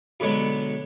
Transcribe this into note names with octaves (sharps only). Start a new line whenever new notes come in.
B2 D3 F#3 G#3 B3